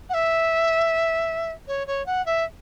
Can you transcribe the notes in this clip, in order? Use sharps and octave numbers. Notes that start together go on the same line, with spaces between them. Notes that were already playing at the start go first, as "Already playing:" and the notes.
F#5
E5
C#5
C#5
F#5
E5